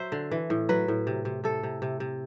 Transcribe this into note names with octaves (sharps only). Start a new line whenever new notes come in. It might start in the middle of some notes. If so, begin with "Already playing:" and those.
Already playing: F#3 C5 E5
D3
E3
A2
F#3 B4
A2
C3
C3
C3 A4
C3
C3
C3